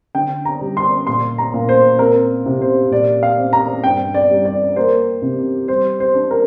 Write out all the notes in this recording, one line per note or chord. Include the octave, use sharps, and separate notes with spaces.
D3 G5
A#5
G3
C6
A#2 C6
A#5
A#2
C5
C4 A#4
C3
C5
A#2 D5
F5
C4
A#5
G2 G5
D5
G3
D5
A#3 C5
C3
G3 C5
C5
D4
A#4